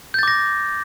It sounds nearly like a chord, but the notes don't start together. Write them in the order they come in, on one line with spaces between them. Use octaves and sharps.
G6 A6 D6 A#6